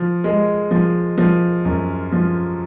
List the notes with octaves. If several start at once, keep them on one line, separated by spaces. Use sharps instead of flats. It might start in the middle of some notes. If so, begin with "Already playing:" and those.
Already playing: F3
G#3
F3
F3
F#2
F3